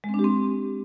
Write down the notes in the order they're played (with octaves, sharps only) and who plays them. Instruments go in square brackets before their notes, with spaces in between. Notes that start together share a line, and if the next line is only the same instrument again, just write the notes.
[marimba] G#3
C4
D4
G4
C4